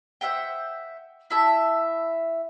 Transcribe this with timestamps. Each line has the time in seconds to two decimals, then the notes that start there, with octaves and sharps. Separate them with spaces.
0.21 C5 E5 F#5 G5
1.30 E4 E5 A5